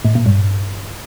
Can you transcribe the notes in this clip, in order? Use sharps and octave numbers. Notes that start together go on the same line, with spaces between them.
A2
A#2
G2